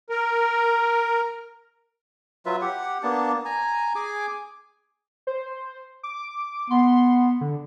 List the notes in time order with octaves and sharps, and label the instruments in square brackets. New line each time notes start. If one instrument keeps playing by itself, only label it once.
[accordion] A#4
[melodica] F#3 F4 B4 E5
G4 F#5
A#3 B3 D4 A5
G#5 A#5
G#4 G#5 D6
[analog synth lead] C5
D6
[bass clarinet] B3 [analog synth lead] C6
[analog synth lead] D3